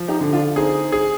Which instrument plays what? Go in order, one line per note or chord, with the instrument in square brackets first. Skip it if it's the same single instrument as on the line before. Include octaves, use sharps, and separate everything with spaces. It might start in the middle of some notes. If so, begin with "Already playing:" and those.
Already playing: [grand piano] F3
[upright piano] D#4 G4
[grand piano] D3
[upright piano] D4 F4
[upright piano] C4 D#4 [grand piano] G#4
[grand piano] G#4